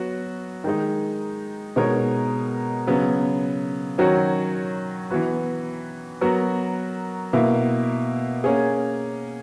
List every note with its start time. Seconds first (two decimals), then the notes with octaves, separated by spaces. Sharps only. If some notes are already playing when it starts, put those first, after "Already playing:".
Already playing: F#3 B3 F#4
0.64 D#3 G#3 D#4
1.76 B2 G#3 D#4 A#4 C#5
2.87 C#3 F#3 B3
3.98 D#3 F#3 C#4 F#4
5.10 E3 B3 F#4 B4
6.21 F#3 B3 F#4 A#4
7.33 B2 A#3 E4
8.44 A#3 C#4 G#4